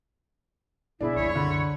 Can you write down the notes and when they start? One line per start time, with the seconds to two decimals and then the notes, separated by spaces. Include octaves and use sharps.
1.01 B2 D4 E4 G#4
1.16 C2 F#2 C#5
1.35 D3 B5